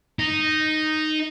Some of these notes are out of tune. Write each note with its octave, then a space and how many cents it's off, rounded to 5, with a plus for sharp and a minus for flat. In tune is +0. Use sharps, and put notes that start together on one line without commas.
D#4 -5